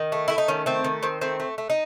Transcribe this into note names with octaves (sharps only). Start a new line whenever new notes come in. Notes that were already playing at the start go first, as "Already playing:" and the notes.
Already playing: D#3
A3
A3 E4
D#4
D#3 C#4
A3 C4
D#3
D#3 C4
A3 C4
A3
A3
D#4